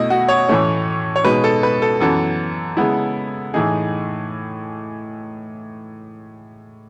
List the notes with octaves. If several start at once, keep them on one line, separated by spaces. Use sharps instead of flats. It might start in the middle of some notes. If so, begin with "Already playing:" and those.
Already playing: B2 A3 E4 D#5
F#4
C#5
A2 E3 A3 C#4
C#5
B2 G#3 D#4 B4
A4
B4
A4
F#2 E3 B3 A4
C#3 G#3 B3 E4
A2 E3 A3 D#4 G#4